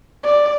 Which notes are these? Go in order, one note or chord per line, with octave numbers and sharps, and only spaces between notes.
D5